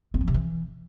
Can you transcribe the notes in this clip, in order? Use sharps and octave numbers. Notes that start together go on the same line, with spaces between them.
C4
F3
C3
E3